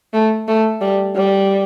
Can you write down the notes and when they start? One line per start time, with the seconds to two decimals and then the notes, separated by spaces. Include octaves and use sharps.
0.13 A3
0.48 A3
0.81 G3
1.16 G3